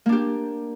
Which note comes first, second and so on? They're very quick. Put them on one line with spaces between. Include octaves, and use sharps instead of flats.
A#3 D4 G4